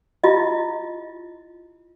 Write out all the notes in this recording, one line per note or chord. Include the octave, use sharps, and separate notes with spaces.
E4 F4 D#5